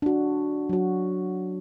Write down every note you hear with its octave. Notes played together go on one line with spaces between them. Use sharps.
D4 F#4
F#3 F#4